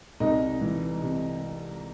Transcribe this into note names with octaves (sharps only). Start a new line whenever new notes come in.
C2 D#4 D#5
E3
C3